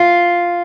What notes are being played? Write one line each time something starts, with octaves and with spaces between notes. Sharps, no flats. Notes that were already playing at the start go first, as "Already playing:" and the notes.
Already playing: F4